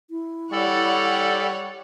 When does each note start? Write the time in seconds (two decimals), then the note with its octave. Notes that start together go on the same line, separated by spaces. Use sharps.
0.10 E4
0.52 G3 A4 C#5 D5 F#5